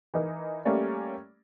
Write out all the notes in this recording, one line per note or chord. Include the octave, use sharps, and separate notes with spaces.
E3 D#4 A#4
G3 A3 A#3 C#4 D5